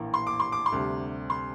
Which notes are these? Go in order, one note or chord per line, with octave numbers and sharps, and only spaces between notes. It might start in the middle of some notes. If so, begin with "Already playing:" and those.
Already playing: A#1 A2 E3 A#3
C6
D6
C6
D6
C6
D2 C3 G3
C6